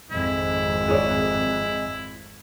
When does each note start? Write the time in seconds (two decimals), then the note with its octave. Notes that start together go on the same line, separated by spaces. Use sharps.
0.11 G#1 F2 G#3 E4
0.88 G#4 C#5 D5